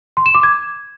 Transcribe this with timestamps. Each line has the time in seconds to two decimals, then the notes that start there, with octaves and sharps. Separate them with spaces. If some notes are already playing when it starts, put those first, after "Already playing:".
0.17 C6
0.26 E7
0.35 D6
0.43 G#6